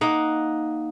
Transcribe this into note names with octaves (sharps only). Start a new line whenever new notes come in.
A#3 D#4 F#5